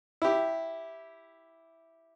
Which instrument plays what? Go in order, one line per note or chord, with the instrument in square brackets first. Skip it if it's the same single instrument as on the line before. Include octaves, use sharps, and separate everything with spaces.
[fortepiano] E4 G4